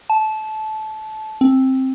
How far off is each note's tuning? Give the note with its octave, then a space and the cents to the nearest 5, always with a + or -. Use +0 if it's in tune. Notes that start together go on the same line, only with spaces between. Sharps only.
A5 -20
C4 +10